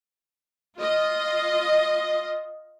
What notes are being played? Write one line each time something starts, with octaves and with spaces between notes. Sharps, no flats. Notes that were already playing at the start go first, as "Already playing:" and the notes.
F4 D#5